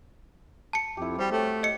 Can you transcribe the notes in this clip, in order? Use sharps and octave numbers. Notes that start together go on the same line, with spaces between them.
A5 C#7
F2 E4 G4
G3 C4 F#4 C5
A3 G4 C#5
D#5 C#7